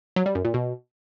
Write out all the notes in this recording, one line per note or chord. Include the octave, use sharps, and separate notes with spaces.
F#3
G3
F#2
A#2
B2